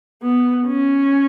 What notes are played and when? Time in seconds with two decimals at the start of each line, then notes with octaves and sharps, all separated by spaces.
0.23 B3
0.68 C#4